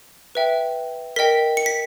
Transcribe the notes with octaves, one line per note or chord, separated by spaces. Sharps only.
B4 E5 G5
A#4 D#5 G5 B6
C#7
B6